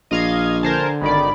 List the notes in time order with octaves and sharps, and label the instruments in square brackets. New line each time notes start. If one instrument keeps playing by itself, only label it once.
[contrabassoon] A#1 [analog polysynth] D#5 F5 G#6
[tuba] D3 [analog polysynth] A#4 C5 A5 [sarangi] G#5
[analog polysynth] G#1 D#3 D5 [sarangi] B5